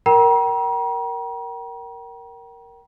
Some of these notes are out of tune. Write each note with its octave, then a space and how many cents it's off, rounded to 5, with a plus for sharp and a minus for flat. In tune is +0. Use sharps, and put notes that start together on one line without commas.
A#4 +0 G5 -25 A#5 +40